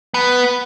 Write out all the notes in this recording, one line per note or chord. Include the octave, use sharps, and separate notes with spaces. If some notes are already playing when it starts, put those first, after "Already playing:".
B3